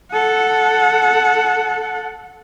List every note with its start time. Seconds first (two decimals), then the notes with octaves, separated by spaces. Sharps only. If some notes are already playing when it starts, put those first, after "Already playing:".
0.12 A4 F#5